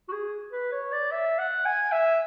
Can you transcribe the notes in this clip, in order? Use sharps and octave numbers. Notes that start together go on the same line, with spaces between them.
F#4
G#4
B4
C#5
D5
E5
F#5
G#5
E5